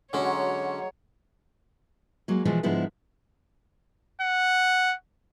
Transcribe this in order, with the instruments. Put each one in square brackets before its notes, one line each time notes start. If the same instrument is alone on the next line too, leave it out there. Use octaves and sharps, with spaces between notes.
[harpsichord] D3 C#4 F#4 [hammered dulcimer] F#3 G#3 [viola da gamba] C#5
[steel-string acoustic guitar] F#3 G#3 A#3
B2 E3 F3 G#3 B3
G#2 D3 F3 G#3 B3 E4
[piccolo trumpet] F#5